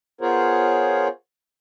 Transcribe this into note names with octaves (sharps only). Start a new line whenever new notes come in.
B3 F4 G#4 A#4 C5 C#5